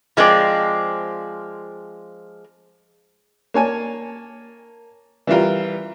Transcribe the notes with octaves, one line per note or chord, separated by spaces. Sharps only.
F3 G#3 C4 D4 D5
A#3 C#5 G#5 A5
E3 G3 E4 F4 A#4